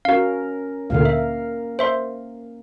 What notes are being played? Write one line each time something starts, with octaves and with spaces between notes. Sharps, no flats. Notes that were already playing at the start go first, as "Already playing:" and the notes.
C#4 F#4 A#4 F5
D2 A#2 D3 A#3 A#4 F5
E5
C5 E5 C6